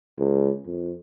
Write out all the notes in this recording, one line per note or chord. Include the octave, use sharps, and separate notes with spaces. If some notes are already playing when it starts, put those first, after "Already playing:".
C#2
F2